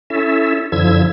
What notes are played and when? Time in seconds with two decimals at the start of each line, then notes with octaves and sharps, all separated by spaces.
0.10 C#4 E4 A4 E5
0.72 F#2 D3 F3 E4 E6 G#6